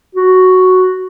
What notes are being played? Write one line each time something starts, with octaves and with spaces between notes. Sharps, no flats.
F#4